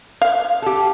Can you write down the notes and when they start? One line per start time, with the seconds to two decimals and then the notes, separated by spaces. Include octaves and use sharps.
0.22 F5
0.62 G4 A4